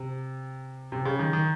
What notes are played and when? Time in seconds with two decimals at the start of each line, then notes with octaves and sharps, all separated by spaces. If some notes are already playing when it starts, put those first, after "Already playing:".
Already playing: C3
0.92 C3
1.05 C#3
1.19 D#3
1.33 D#3